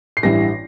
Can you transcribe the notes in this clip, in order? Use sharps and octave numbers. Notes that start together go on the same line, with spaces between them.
C7
A1 G2 E3 A#6